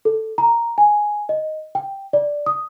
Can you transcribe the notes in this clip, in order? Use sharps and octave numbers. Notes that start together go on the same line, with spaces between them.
A4
A#5
G#5
D#5
G5
D5
D#6